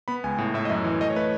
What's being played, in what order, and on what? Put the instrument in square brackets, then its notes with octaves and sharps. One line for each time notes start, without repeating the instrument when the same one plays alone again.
[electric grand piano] B3 B5
C#2 G#5
A2
A2 E5
D#5
F#2 E5
E3
A3 D#5
C#5
A3 B4